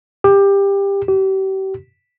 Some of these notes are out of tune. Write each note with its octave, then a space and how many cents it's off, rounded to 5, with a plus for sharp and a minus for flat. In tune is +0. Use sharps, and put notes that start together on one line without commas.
G4 +20
G4 -35